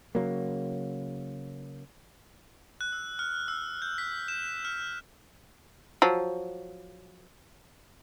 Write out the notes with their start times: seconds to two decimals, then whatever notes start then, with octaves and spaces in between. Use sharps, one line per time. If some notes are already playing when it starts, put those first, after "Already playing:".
0.15 C#3 F#3 A#3
2.81 F#6
2.92 E6
3.19 F6
3.48 E6
3.82 G6
3.98 B6
4.28 E7
4.65 F6
6.02 F3 F#3